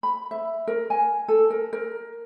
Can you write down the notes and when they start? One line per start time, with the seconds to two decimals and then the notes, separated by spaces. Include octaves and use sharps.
0.03 B5
0.31 E5
0.67 A#4
0.90 G#5
1.28 A4
1.50 A#4
1.73 A#4